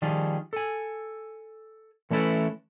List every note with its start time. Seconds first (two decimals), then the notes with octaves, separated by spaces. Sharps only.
0.02 D#3 F3 G3 F4 G#4
0.53 A4 G#5
2.10 E3 A3 C#4 E4 A4 B4